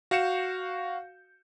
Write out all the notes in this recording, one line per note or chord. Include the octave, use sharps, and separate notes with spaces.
F#4 F5 G6 C#7 E7